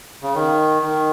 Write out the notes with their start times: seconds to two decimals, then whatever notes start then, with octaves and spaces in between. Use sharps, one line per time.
0.22 C#3
0.35 D#3
0.82 D#3